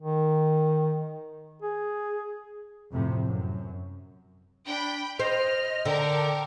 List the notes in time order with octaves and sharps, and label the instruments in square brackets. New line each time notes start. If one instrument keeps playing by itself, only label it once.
[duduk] D#3
G#4
[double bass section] F2 A2 C3
F#2
[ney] D4 [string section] G5 B5
[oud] C5 [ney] D#5 [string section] F6
[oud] D3 [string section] A#4 A5 [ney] G5